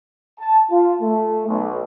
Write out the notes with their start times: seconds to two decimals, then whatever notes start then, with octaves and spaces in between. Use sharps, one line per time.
0.40 A5
0.70 F4
1.01 A3
1.48 B1